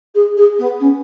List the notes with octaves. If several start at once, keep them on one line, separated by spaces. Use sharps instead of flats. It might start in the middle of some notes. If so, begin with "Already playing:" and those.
G#4
G#4
B3
C#4